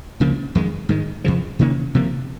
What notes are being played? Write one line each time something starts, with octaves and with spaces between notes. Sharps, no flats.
C#2 C#3 F3 A#3
F2 D#3 G#3
G#2 D#3 G#3
F2 C#3 F3
C3 D#3 A#3 C#4
C3 F3 A#3